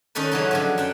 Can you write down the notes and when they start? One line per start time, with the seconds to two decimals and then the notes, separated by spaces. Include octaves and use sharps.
0.15 D#3 C#4 D#4 A4 B4
0.32 C#3 E3 F#3 D#4
0.51 D3 F3 F#3
0.78 F#2 F#5 G5